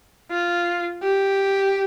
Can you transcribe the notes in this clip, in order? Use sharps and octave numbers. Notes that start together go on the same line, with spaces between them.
F4
G4